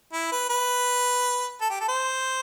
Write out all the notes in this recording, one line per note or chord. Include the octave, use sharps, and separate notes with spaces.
E4
B4
B4
A4
G4
A4
C5